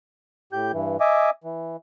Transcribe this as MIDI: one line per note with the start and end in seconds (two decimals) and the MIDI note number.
0.53 0.72 45
0.53 0.72 67
0.53 0.72 91
0.72 0.97 43
0.72 0.97 52
1.00 1.30 75
1.00 1.30 76
1.00 1.30 80
1.00 1.30 86
1.44 1.77 52